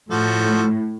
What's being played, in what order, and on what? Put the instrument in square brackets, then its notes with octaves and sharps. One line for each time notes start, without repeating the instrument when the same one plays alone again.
[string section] A2 [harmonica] F3 F#4 A4